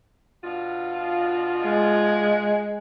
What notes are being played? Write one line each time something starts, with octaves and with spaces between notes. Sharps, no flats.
B2 D4 F4
G#3